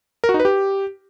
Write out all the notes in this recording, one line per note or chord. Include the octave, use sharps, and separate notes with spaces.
A#4
F#4
D#4
B4
G4